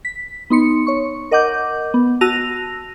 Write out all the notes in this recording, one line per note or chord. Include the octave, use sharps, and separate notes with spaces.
B6
B3 D#4 C6 C#7
C#5 C#6
A#4 D#5 F#5 D6 G6
B3
F#4 A5 E6 A#6 D#7 F7